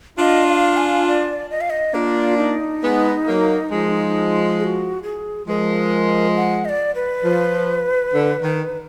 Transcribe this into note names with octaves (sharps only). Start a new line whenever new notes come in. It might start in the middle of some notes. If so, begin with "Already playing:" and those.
D4 F4 D#5 F5
F5
G#5
D5
D#5
F5
D#5
A#3 D4 F4
D#4
G#3 B3
F#3 A#3
F3 G#3
G#4
F#4
G#4
F3 G#3 A#4 B4
F#5
D#5
D5
B4
F3
D3
D#3